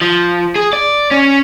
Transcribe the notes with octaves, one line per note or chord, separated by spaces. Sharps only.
F3
G#4
D5
C#4